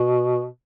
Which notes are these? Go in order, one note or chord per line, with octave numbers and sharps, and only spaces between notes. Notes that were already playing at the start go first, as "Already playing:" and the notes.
Already playing: B2